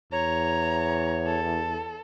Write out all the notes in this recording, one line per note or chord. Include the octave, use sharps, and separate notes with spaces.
E2 C#5 A#5
A4